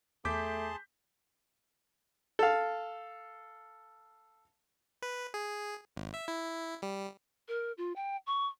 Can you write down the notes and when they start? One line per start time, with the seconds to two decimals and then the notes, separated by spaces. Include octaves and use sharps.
0.25 E2 A3 G#4 A5 C6 D6 G6 B6
2.39 A4 F5
5.02 B4
5.34 G#4
5.97 G#1
6.14 E5
6.28 E4
6.82 G3
7.48 A#4
7.78 F4
7.96 G5
8.27 C#6